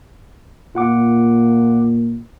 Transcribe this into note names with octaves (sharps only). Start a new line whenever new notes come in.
A#2 F4 F#5 D6